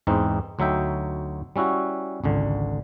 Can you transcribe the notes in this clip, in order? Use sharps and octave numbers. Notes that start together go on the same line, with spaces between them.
E2 G#2 E3 C4 D#4
D2 F#3 D#4 E5 G5
G3 C#4 E4 F#4
G#1 C#2 D3